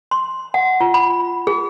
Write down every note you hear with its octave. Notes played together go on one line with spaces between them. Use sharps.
C6
F#5
F4
B5
G#4